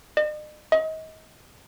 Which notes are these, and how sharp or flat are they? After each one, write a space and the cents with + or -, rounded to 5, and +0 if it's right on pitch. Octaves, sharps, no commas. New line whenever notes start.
D#5 -45
D#5 +30